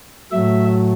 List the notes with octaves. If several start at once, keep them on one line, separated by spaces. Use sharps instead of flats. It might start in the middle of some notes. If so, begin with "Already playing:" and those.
A2 F#3 A3 E5